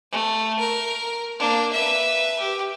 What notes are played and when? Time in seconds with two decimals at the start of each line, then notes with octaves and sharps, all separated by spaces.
0.12 A3
0.59 A#4
1.39 A#3 D4
1.73 B4 E5
2.39 G4